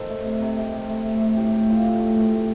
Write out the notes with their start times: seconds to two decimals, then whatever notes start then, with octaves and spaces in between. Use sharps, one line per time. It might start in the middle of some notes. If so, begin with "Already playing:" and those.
Already playing: D#3 A4 C5
0.10 A3
0.26 C3
0.42 C3
0.58 C3
0.74 A3
0.90 A3
1.05 A3
1.21 C3
1.37 A2 G4
1.53 A3
1.68 A2 F4
1.84 A2
2.00 A3
2.16 A2
2.31 A3